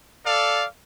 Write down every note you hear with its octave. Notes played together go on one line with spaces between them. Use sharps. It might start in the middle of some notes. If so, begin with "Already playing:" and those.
A4 D5 F5